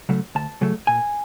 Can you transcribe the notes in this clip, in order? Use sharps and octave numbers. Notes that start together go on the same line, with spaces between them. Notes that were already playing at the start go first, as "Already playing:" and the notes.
C#3 F#3 A3
D2 A5
C#3 F#3 A3
A#2 G#5